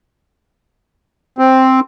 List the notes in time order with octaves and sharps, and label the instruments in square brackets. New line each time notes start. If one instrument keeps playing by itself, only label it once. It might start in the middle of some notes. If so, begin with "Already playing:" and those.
[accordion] C4